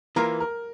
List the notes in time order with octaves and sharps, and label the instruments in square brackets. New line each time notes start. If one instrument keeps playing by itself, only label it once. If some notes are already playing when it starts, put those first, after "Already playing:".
[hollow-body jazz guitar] E3 A#3 F4 [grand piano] A#4
[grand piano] A#4